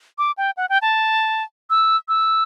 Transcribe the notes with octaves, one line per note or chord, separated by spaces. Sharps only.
D6
G5
F#5
G5
A5
E6
E6